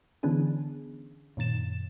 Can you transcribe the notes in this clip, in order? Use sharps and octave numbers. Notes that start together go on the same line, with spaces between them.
D3 E3 B3 C#4 D4 G#4
F#2 A#2 D#3 A6 E7